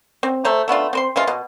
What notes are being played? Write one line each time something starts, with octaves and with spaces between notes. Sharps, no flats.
C4
A3 C5 A#5
A3 B3 D4 F4
C4 C5 C6
E3 G#3 F4
B2